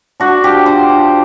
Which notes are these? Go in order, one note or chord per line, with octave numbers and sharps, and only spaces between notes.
D4 F#4
F3 G4
D4 C5
F3